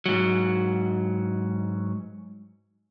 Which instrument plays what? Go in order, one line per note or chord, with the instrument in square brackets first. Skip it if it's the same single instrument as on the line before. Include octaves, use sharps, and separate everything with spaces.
[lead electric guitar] G#2 F#3